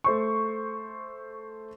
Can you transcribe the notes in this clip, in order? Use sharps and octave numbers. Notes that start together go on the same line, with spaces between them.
A3 C5 C#6